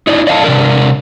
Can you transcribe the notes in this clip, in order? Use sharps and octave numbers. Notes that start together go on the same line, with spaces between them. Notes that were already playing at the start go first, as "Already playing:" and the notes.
D#4 E4 D5
D5 D#5 F5 G5 A5
C3 D4 A#4